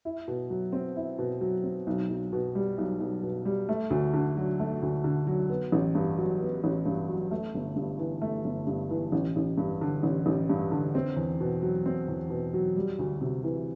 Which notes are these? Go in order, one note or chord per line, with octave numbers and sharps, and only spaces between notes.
E4
B2
F#3
C4
E4
B2
F#3
C4
B1
B1
B2
G3
B1
B1
B2
G3
A3
D2
D3
F#3
A3
D2
D3
F#3
B3
A1
G2
F#3
B3
A1
G2
F#3
A3
G1
G2
E3
A3
G1
G2
E3
A1
A1
G2
D3
A1
A1
G2
D3
C4
E2
B2
F#3
C4
E2
B2
F#3
G3
D2
C3
E3